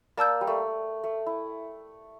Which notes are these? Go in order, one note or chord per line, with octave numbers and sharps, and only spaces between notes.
A#3 D5 A5 E6 G6
G3
A3
A3
E4